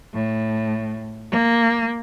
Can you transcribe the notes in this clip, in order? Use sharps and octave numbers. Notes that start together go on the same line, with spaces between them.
A2
A#3